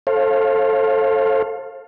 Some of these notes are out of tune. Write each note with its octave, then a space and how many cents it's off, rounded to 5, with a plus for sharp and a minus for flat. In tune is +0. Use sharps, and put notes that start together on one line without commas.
A4 +0 C5 +40 F5 +0